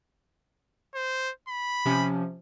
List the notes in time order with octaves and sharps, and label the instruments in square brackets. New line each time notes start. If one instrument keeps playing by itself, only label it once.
[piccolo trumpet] C5
B5
[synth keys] C3 F3 C#4